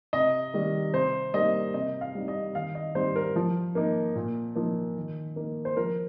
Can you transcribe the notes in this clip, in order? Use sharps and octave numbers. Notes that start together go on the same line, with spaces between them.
C3 D#5
D#3 G3
C3 C5
G3 A#3 D#4 D#5
C3 D#5
F5
G3 C4 D#4
D#5
D#3 F5
D#5
G3 C4 D#4 C5
A#4
F3
A#3 D#4
A#2
F3 A#3 D#4
D#3
A#3 D#4
C5
F3 A#4